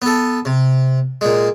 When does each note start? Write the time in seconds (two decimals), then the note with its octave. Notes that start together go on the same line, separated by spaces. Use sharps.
0.02 B3 A4
0.45 C3
1.21 A#2 G#3